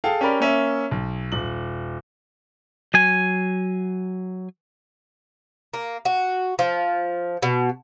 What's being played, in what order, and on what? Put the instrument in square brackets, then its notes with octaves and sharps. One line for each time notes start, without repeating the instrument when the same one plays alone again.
[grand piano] G#4 A4 F5 G5 A5
C#4 G4 A#4 D5 B5
A#3 C#4 E5
B1
D#1 F#7
[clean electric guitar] F#3 G#5
[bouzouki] A#3
F#4
F3
B2